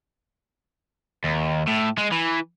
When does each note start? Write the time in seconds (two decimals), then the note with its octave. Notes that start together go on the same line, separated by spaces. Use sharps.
1.24 D#2
1.67 A2
1.97 G#3
2.12 E3